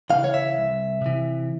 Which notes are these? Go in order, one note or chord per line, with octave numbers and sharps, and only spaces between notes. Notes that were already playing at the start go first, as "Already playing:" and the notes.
C#3 E3 F5
C#5
E5
C2
C3 E3